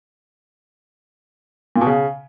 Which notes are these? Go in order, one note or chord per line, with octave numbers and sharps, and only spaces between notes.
A#2
B2
C#3